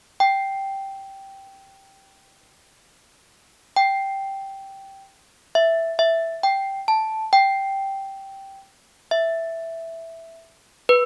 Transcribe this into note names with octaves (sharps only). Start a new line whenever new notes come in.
G5
G5
E5
E5
G5
A5
G5
E5
B4